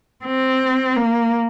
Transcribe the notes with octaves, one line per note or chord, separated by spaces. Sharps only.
C4
A#3